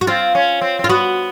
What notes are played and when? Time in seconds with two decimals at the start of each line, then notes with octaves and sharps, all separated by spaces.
0.01 F#4
0.07 C4 F4
0.35 C#4
0.61 C4
0.79 C4
0.84 F4
0.89 B3 F#4